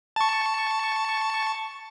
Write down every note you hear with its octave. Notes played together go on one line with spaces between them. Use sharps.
A5 C#6